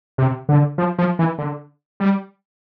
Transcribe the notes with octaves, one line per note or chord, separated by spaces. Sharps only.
C3
D3
F3
F3
E3
D3
G3